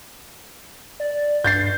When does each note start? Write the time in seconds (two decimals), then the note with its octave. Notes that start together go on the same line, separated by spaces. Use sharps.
1.00 D5
1.44 G2 G6 A6 C7